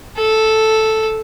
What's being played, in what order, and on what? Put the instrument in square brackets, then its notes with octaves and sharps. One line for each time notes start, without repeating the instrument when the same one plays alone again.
[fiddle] A4